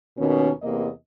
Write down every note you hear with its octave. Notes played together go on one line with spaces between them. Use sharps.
D#2 B2 D#3 C#4
E2 C3 A#3 D#5